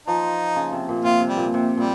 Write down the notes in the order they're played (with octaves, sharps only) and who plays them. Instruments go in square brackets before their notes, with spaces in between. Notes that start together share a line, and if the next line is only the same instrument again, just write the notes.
[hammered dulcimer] F3 [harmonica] D#4
[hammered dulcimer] C#3
C3
A#2
[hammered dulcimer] C3 [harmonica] F4
[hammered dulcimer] C3
[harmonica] G3
[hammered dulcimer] A#2
C3
[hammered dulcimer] A#2 [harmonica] G3